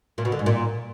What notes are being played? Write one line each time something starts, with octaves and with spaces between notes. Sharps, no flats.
A#2
B2
D3
G#2
A#2